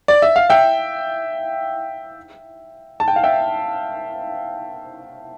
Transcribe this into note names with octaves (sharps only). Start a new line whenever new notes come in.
D5
E5
F5
E5 G5
A5
G5
F5
E5 G5